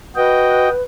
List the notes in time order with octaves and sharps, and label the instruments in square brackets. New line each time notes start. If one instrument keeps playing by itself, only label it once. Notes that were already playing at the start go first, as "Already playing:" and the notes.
[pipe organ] F#4 D#5 G5 [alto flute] B4